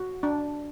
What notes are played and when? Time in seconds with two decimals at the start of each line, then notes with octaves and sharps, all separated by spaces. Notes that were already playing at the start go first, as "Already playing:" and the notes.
Already playing: F#4
0.23 D4